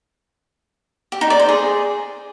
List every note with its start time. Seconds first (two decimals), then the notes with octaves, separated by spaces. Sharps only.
1.12 G4
1.21 D#4
1.30 D5
1.39 C5
1.49 G#4